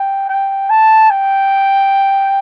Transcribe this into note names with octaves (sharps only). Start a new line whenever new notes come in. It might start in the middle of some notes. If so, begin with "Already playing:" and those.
Already playing: G5
G5
A5
G5